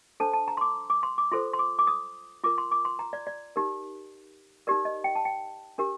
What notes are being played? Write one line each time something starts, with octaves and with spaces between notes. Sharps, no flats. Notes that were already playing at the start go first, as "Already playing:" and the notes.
D4 A4 C5 A5
A5
A#5
C6
D6
D6
C6
D6
F4 A4 C5 C6
C6
D6
D6
D#6
F4 A#4 D6
C6
D6
C6
A#5
D5
D5
D#4 G4 A#4
D#4 G4 A#4 D5
D#5
G5
A5
G5
D4 G4 A#4